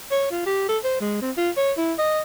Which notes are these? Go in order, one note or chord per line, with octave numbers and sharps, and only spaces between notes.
C#5
F4
G4
A4
C5
G#3
C4
F4
C#5
E4
D#5